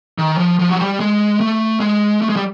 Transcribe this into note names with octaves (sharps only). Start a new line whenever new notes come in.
D#3
F3
F3
F#3
G3
G#3
A3
G#3
A3
G#3
G3